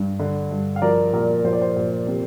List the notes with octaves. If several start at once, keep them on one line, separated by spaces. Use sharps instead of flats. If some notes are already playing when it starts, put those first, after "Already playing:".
Already playing: G2
D3
G2
F5
F3 A#4 D5
A#2 A#4 D5
F3 C5
D5
C5
A#2
C3